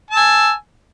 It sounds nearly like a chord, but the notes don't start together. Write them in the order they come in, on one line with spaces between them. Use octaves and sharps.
A5 E6 G#5